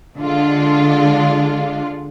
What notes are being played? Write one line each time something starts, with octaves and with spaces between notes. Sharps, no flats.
D3 G#3 D4 F4